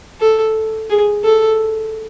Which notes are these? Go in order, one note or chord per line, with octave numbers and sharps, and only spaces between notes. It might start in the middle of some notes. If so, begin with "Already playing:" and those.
A4
G#4
A4